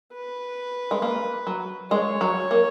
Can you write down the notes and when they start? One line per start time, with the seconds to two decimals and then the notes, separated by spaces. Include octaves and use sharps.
0.13 B4
0.91 G#3
1.02 A#3
1.47 F#3
1.91 G#3 C#5
2.21 F#3
2.51 A#3